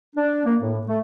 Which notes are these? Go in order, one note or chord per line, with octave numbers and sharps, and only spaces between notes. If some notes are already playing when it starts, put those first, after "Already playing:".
D4
A#3
A2
A3